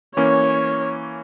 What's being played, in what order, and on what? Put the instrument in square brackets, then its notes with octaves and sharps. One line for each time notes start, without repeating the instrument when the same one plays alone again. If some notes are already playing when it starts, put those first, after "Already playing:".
[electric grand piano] E3 A#3 C#4 [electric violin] C#5